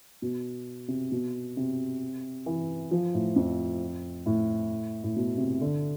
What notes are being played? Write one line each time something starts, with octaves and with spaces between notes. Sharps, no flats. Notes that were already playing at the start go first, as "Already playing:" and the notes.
B2
C3
B2
C3
E3
F3
A2
F2
A2
A2
B2
C3
D3